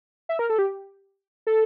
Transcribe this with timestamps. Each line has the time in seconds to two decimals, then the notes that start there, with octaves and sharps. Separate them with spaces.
0.29 E5
0.39 A#4
0.50 A4
0.59 G4
1.47 A4